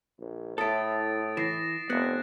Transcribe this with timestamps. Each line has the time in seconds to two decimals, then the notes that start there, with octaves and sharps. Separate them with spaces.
0.19 A#1
0.58 A2 E4 A4 D#6 A6 D7
1.37 E3 A#6 C7 E7
1.90 F1 B3 F#6 G#6 E7